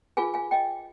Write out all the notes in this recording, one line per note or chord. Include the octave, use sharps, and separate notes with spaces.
F4 G#4 B4 F5 G#5
F5 G#5
D#5 G5